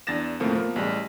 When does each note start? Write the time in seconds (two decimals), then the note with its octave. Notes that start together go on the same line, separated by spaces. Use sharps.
0.07 E2 D4 A6 A#6 E7
0.40 D#2 A2 F3 A3 A#3 C4
0.55 F3 A#3 B3
0.76 A1 G3 G#3